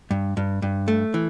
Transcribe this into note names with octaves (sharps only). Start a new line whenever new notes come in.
G2
G2
G2
A3
E3